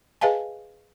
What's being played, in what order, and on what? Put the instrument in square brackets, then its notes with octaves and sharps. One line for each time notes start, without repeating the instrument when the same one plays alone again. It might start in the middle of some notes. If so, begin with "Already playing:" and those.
[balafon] G#4 B4 D#5 F5 G#5 A5